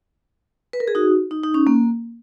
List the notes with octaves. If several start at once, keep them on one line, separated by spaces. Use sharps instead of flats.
B4
A#4
G#4
D#4 F#4
D#4
D#4
C#4
A#3